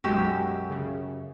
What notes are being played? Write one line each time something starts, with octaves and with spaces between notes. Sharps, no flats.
B1 F#2 G#3 F#4 G4 E6
C#3